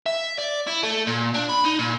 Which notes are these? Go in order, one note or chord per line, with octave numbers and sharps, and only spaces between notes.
E5
D5
E4
A3
A#2
D4
B5
D#4
A#2